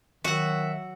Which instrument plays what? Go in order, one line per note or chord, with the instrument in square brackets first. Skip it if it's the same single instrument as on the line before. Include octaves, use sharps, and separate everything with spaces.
[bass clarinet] D#3 [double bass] F#3 [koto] F#4 F#5 [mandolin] E5